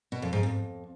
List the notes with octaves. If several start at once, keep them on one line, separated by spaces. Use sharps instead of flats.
B2
F2
G#2
F2